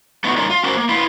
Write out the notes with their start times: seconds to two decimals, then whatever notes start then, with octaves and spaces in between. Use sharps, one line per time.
0.24 A3 B3 D#4 E4 F#4
0.37 G3 A3 A#3 C#4 D#4 F4
0.50 F4
0.64 C#4 D4 F#4 A#4 C5
0.77 A#3
0.89 E4 F4 B4 F5